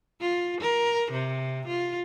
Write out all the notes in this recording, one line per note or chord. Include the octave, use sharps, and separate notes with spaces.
F4
A#4
C3
F4